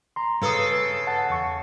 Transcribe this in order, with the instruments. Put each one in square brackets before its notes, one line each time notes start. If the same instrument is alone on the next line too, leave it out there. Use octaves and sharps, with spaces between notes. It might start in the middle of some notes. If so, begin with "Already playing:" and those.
[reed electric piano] A#5 C6
[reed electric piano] G2 B4 D#6 [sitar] C#3 A4
[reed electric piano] F#5 A5
E2 C#6